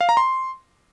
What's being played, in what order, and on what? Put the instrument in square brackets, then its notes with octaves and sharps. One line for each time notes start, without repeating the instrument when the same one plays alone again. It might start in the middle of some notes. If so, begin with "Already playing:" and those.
[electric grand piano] F5
A#5
C6